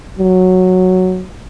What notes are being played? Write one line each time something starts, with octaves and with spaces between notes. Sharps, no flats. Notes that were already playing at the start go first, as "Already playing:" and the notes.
F#3